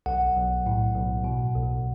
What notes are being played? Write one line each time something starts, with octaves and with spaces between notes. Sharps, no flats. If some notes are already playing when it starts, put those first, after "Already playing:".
B1 F#5
B1
A2
B1
B2
B1